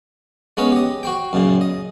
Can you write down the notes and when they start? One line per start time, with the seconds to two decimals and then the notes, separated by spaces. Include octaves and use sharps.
0.57 G#3 B3 C#4 B4 D#5 F5
0.72 G4 D#5
1.03 F#4 C5 G5
1.33 F#2 A#2 C#3
1.61 D#5